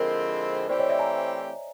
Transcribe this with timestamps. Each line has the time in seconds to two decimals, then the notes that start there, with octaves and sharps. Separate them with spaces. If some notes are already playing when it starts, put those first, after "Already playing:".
Already playing: D3 F3 G#3 C4 E4 A#4
0.69 E3 A3 C4 E4 G4 C5 D5
0.79 C#5 D#5
0.89 D5 E5
0.99 G#5 A#5